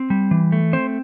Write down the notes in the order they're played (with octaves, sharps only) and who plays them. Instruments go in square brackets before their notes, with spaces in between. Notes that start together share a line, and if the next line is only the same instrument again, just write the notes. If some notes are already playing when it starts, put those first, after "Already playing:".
Already playing: [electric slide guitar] C4
G3
E3
A3
C4 C5